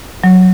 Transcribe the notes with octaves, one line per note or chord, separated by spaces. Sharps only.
F#3